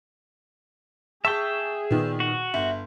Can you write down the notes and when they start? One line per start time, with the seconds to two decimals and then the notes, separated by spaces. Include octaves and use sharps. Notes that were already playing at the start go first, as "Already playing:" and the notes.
1.25 G#4 E5 G5 A5 C#6 B6
1.91 A#2 D#3 B3
2.20 F#4
2.54 G1 E5